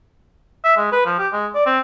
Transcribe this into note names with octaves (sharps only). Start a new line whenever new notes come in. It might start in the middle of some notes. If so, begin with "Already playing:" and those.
E5
G#3
B4
F3
G4
G#3
D5
C4